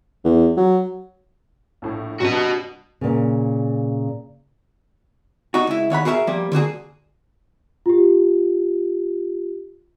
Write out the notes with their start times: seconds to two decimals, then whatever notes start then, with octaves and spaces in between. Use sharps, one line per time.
0.24 E2
0.57 F#3
1.82 A#1 A2
2.21 G2 C3 F#3 F#4 D#5
3.01 A#2 C#3
5.54 D#4 F#4
5.67 C#2 E4
5.90 D#2 C#5 F#5 B5
6.05 F#4 G#4 A#4 D#5 E5
6.27 F3 G3 A#3
6.52 D3 A#3 F#4 G#4
7.86 F4 G4